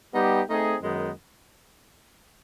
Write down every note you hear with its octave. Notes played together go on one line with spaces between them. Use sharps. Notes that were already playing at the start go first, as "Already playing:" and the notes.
G3 B3 D#4 G4
A3 C4 D#4 G#4
F#2 D#3 G#3 B3 D#4